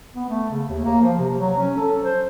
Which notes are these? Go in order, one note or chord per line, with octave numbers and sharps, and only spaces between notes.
B3
A3
C#3
D#2
A#3
F3
C3
F#3
C#4
A4
C5